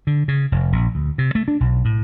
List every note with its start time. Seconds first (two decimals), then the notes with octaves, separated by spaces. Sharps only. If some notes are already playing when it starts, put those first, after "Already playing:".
0.07 D3
0.28 C#3
0.52 F1
0.72 A#1
0.95 D2
1.18 C3
1.35 A3
1.48 D4
1.60 B1
1.85 A2